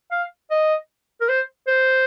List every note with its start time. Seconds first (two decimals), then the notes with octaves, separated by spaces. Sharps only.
0.11 F5
0.51 D#5
1.21 A#4
1.29 C5
1.67 C5